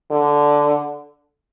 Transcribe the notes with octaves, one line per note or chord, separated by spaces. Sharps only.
D3